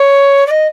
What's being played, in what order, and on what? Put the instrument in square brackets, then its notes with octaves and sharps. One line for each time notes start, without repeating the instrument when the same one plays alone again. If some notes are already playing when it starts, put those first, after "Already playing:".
Already playing: [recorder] C#5
D5
D#5